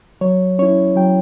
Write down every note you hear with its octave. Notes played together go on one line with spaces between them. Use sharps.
F#3 C#5
C#4 E4 C#5
F#3 G5